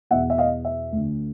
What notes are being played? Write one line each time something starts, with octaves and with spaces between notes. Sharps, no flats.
E2 B2 E5 F#5
E5
D#5 F5
E5
D2 D3